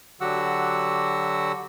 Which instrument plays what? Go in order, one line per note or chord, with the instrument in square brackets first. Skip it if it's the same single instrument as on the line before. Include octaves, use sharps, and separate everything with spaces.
[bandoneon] D3 F#3 F#4 G4 F#5 E6